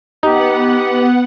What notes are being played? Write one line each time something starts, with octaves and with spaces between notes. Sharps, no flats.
B3 D#4 G4 F#5